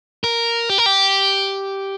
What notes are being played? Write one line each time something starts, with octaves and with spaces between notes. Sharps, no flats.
A#4
G4
A#4
G4